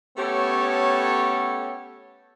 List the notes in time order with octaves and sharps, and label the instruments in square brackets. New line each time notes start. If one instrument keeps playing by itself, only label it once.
[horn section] A3 B3 C#4 G4 A4 C#5